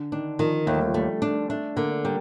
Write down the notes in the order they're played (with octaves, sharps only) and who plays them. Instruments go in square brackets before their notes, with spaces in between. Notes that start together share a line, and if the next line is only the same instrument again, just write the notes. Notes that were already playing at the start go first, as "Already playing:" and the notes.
Already playing: [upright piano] D3
[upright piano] D#3 [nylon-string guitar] D4
[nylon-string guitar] D#3 [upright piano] F3
[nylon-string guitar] D#2 [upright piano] A3
[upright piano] G3
F3
[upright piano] G3 [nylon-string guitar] A3
[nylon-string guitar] D4
[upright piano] A3 [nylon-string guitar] D4
[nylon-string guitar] D3 [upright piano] A#3
[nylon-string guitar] G3 [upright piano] A#3